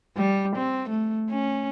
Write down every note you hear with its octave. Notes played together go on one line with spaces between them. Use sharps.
G3
C4
A3
C#4